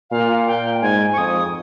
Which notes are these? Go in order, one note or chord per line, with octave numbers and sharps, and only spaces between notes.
A#2 F5
G5
G#2 G#5
C#6
F2 D#6